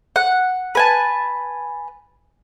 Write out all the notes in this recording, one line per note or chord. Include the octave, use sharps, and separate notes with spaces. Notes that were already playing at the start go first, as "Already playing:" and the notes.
F#5
B4 G#5 A5